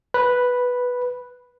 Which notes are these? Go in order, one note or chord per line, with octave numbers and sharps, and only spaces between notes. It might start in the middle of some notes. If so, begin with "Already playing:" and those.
B4